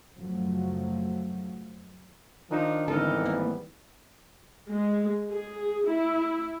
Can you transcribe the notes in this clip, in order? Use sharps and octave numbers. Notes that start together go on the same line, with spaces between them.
F#2 C#3 F3 F#3 A3
D#3 F3 D4 D#4
G#1 D3 E3 G3 B3 D#4 A4 A#4
A#3
G#3
G#4
E4